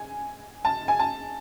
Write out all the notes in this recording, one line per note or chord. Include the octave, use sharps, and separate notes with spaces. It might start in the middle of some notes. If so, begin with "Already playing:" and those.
Already playing: G#5
A5
G#5
A5